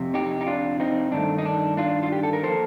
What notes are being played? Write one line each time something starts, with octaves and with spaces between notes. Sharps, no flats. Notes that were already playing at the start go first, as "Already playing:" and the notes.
Already playing: F2 C3
D#4 G4
D#4
D4 F4
C4 D#4
G2 D#3 A3 D4
D#4
D4
D4 F4
F4
G4
A4
A#4
F3 A#3 A4 C5